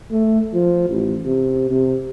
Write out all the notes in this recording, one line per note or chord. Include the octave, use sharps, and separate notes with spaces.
A3
F3
A1
C3
C3